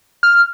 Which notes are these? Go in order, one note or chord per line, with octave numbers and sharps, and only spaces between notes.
F6